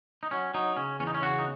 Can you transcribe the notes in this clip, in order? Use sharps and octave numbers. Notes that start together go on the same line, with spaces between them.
D#4
F#3 C#4
F#3 D#4
C#3 C#4
E2 C#4
D#4
C#4
C#3 F#4
D#4